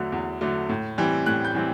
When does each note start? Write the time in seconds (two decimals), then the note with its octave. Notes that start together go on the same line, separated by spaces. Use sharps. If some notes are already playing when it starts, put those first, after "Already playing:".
Already playing: E2 D3 F#3 A3
0.12 E2
0.41 D3 F#3 A3
0.69 A2
0.98 E3 G3 C4
1.26 A2 F#6
1.45 G6
1.55 E3 G3 C4